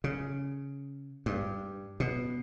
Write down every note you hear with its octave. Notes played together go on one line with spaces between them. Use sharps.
C#3
G2
B2